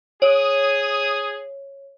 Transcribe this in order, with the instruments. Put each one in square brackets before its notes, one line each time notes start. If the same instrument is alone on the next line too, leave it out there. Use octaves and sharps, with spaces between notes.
[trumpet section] G#4 D#6 [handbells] C#5